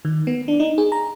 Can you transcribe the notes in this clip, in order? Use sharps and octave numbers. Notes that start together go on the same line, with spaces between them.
D#3
B3
D4
D#4
G#4
A#5